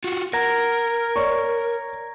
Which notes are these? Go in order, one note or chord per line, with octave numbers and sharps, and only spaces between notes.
F4 F#4
A#4 F#5 A#5 G#6 A#6
C#5 D5 C#6